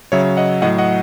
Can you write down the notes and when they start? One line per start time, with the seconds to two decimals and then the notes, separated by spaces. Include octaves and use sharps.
0.12 C#3 F#3 C#5 E5
0.37 D#5 F#5
0.62 A2 D#5 F#5
0.66 F#3
0.78 D#5 F#5